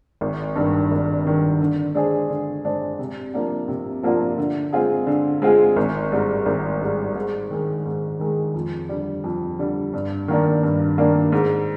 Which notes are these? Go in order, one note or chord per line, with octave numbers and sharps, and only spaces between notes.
G#1
G2 D#3
G#1
G2 D#3
D3
G#3 D4 G#4 C5
D3
G#3 D4 G#4 C5
C3
F3 A#3 D4 F4
C3
F3 A#3 D4 F4
D3
G#3 C4 F4 G#4
D3
G#3 C4 F4 G#4
G#1
G#2 G3
G#1
G#2 G3
G#2
D#3 G#3
G#2
D#3 G#3
F2
D3 G3
F2
D3 G3
G2
D#3 A#3 D4
G2
D#3 A#3 D4
G#2